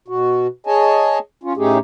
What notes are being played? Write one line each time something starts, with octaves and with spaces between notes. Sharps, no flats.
B2 F#4
G#4 C#5 D#5 G#5 A5
C#4 F4
A2 A3 C#4 D#4 G4 G#4